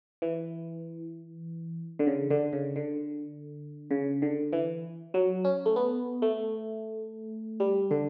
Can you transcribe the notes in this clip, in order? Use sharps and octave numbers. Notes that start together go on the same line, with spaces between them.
E3
D3
C#3
D3
C#3
D3
C#3
D3
E3
F#3
C#4
A3
B3
A3
G3
D3